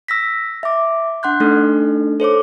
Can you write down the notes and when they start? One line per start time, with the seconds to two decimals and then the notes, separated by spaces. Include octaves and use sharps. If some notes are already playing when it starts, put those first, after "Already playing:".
0.08 E6 A#6 B6
0.63 E5 D6
1.23 D4 F#5 C6 F#6 G6
1.40 A3 D4 D#4 A4
2.20 A4 C5 C#5 D6